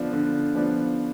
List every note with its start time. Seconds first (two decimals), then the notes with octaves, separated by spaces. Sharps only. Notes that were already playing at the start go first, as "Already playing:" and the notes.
Already playing: D3 F3 B3 D4
0.13 D3
0.55 F3 B3 D4